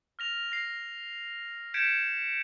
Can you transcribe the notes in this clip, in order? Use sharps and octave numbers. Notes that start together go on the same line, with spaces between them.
F6 A#6 F7
A#6 C7
G6 G#6 B6 C#7 D7 E7